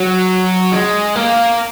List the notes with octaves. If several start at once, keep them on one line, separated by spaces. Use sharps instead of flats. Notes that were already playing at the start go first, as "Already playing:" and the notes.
Already playing: F#3
G#3
A#3